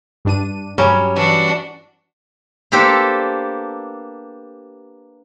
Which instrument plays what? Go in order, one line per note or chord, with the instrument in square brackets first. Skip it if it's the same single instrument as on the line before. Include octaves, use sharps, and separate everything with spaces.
[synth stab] G2 D4 D#7
[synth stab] G2 [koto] F#3 G3 [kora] C#4
[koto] E3 [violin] D4 F#4
[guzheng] A#3 B3 D4 G4 A4 C5